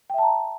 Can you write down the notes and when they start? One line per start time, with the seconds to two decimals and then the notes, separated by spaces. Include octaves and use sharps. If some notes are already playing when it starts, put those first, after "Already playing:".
0.10 G5
0.14 E5
0.18 A5
0.23 A#5